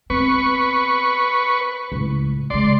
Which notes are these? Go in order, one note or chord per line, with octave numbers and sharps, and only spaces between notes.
B3 C4 B4 C#6
C#2 A2
C#3 G#3 D5 C6